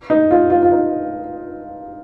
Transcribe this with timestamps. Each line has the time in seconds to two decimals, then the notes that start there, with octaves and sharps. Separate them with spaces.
0.10 D#4
0.31 F4
0.50 F4
0.63 F4
0.71 D#4